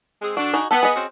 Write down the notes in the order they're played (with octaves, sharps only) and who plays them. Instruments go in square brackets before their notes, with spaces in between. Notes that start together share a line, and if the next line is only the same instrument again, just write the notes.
[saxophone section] G#3 C4 G#4
[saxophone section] D3 D4 [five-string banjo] F#4
[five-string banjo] D#4 F#4 G#4
[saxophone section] B3 [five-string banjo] A4 G5
[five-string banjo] G#4 D#5
[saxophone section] C4 C#4 F#4